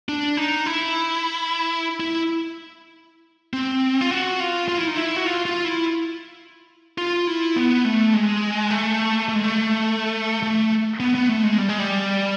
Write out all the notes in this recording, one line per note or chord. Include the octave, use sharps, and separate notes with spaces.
D4
D#4
E4
E4
C4
F4
F#4
F4
F4
E4
D#4
E4
F#4
F4
F4
E4
F4
E4
B3
A3
G#3
A3
A3
G#3
A3
A3
B3
B3
A3
G#3
G3
G#3
G3